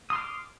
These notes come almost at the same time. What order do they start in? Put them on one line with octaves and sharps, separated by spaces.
D#6 C6 F6 D6